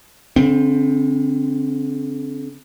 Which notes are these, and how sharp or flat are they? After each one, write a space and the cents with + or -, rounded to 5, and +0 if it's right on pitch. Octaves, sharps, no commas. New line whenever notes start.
D3 -40 C4 +0